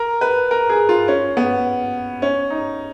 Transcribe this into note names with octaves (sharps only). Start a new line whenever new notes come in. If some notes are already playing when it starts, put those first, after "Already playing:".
Already playing: A#4
B4
A#4
G#4
F4
C#4
B3
C#4
D#4